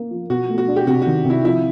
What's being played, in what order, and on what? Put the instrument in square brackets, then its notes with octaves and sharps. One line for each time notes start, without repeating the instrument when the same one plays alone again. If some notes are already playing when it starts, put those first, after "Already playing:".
Already playing: [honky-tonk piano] A#3
F3
[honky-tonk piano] B2 [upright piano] F#4
[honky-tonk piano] A3
[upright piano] F#4
[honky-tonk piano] D4
[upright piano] G4
[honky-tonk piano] C3 [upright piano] F#4
[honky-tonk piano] D#3 [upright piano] F#4
[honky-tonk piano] C3
[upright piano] E4
[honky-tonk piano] F3 [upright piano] E4